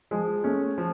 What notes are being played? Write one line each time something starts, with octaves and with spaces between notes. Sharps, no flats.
F3 G#3
A3 C#4
F3